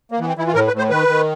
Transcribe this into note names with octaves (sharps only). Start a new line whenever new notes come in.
A#3
E3 B3
C4
E3 E4
F4
A2 A#4
B4
A2
C5
D#3 B4
D#3